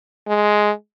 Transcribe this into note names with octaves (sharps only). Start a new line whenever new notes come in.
G#3